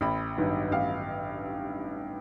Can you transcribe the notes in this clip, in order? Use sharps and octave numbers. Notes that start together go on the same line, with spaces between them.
A1 B5
G2 D#3 F#3 B3
A1 F5